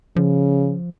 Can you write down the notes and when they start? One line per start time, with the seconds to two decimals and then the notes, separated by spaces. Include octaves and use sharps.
0.16 C#3 F3